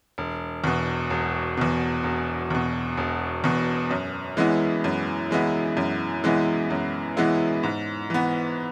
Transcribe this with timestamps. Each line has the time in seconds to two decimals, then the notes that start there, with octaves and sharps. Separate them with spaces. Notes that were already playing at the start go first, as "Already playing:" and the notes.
0.18 E1
0.64 E2 B2
1.10 E1
1.57 E2 B2
2.03 E1
2.50 E2 B2
2.97 E1
3.44 E2 B2
3.91 F#2
4.37 E3 G#3 B3 E4
4.84 F#2
5.31 E3 G#3 B3 E4
5.77 F#2
6.24 E3 G#3 B3 E4
6.70 F#2
7.17 E3 G#3 B3 E4
7.63 G#2
8.10 E3 B3